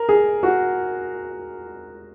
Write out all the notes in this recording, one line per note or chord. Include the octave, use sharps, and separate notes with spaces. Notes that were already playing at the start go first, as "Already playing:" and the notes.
Already playing: A#4
G#4
F#4